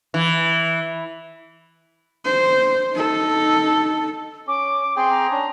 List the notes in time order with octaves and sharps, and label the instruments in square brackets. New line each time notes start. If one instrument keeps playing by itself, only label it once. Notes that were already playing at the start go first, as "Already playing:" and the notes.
[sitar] E3
[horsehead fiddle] C5
D#4 A4
[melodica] C#4 [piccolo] D6
[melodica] C4 G#4 G5 [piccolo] C6
[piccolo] A#5
[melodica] C#4 D4